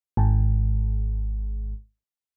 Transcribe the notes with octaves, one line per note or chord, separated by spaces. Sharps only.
G#1 G#2